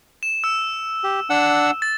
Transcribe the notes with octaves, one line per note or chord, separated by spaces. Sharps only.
E7
E6
G4
D4 F#5 E6
A6